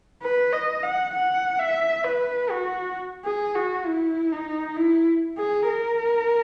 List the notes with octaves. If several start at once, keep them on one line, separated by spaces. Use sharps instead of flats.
B4
D#5
F#5
F#5
E5
B4
F#4
G#4
F#4
E4
D#4
E4
G#4
A#4